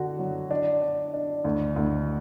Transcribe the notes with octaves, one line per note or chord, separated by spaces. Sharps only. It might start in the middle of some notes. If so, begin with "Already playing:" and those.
Already playing: D3 F#4
F#3
D4
D4
D4
D2
D2